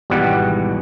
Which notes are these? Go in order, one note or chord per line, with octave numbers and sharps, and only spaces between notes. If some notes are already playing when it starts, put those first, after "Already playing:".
G#1 E2 B2 G3 F#5